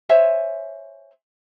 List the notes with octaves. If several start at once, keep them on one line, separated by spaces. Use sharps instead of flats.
C5 C#5 E5 G#5